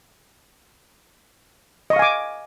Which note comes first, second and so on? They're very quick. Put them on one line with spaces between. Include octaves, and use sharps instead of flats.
D#5 C#6 F5 G#5 D6